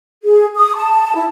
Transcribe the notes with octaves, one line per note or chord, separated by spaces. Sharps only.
G#4
D#6
A5
E4